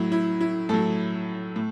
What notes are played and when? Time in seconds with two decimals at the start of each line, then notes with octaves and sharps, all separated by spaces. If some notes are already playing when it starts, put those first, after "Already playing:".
Already playing: A2 F#3 E4
0.12 E4
0.41 E4
0.69 A2 F#3 A4
1.56 A2